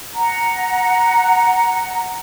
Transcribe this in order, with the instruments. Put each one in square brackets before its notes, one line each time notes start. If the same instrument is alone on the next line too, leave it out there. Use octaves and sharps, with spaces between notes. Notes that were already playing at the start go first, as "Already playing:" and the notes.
[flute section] F#5 A#5